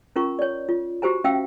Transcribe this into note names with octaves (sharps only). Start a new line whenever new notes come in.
C#4 F4 A#4 A#5 C#6
C#5 D5
F4
F#4 G4 C5 G#5 A#5
C#4 E5 F5 G5 E6